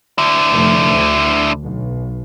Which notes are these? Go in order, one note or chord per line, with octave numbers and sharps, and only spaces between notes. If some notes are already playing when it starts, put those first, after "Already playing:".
D3 E4
F1 A3
D2
B1